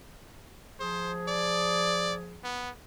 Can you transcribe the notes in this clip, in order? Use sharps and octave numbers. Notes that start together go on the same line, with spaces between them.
F3 G#4 C5
D5
B3